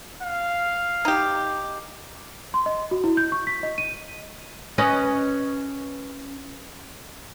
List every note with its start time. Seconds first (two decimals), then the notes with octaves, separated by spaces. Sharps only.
0.23 F5
1.05 D#4 G4
2.54 C6
2.66 D#5
2.91 F#4
3.04 E4
3.17 G6
3.32 C#6
3.47 B6
3.63 D#5
3.78 D#7
4.78 C#4 B4 D#5